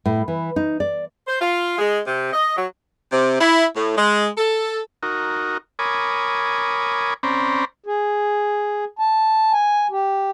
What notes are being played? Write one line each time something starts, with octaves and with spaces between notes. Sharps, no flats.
A2
E3
D#4
D5
C5
F4
G#3
C3
D#5
F#3
C3
E4
A2
G#3
A4
D#4 F#4 A#4
A#4 C#5 G#5 B5 D6 D#6
C4 C#4 C5 D5 A#5 B5
G#4
A5
G#5
G4